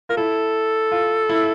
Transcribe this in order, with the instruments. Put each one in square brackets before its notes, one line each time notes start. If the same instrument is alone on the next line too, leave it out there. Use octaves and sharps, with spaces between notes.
[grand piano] F4 [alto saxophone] A#4
[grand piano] E4 [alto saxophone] A4
[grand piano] F4
E4